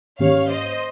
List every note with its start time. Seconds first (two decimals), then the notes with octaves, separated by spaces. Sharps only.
0.19 G#2 D#3 A#3 C#4 G4 C#5 F5
0.49 C5 D#5